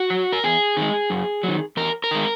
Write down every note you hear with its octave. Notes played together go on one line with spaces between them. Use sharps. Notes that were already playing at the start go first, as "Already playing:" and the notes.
Already playing: F#4
F#3
A#4
E2 G#4
D#3 G#3
F#2
F#3
D#3
E2 A#4
A#4
D#3 G#3